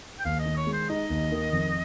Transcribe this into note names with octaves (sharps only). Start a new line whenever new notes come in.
G5
D#2 F5
D#5
D#3
C#5
G#3
C5
D#4 D#5
D#2
D#3
F2